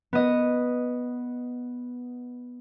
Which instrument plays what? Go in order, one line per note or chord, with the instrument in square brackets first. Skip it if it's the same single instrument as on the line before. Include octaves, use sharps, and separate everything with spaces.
[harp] B3 D#5